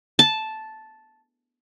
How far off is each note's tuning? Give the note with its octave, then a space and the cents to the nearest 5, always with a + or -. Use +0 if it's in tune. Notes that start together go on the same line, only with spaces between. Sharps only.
A5 -5